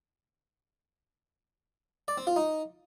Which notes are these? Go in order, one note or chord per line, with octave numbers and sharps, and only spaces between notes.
D5
C4
F4
D#4